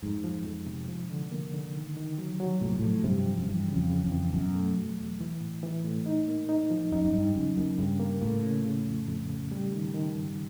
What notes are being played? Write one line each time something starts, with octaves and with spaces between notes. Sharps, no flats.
F2 G#2
F3
F2
C3
F3
D3
A#3
D3
D#3
D#3
F#3
F#3
A2 C3
A#2
A2 F3
G2 C3
F3
F#2
G2 E3
C#3
F2
C#3
F2
E3
F#2 B2
A3
F#3
E2
E3
A2
E3
A2
D#4
A#3
D#4
F3
F#2 D#4
F#2
G2 D#4
F#2 C#3
F#2 A#3
G2 C#3
A#3
A2 A#3
C#3
C#3
F2
F2
C#3
G3
D#3
D#3
G2